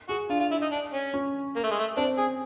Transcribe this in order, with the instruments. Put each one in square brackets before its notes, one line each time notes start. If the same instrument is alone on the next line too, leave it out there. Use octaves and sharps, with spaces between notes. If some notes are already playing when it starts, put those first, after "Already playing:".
[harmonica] F#4 [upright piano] G#4
[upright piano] D4 [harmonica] F4
[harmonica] F4
E4
D#4
D4
C#4
[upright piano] C#4
[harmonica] A#3
A3
G#3
A3
[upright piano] C4 [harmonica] D4
[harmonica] G#4